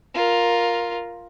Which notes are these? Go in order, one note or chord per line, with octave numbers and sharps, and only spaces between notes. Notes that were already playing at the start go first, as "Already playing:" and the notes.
F4 A#4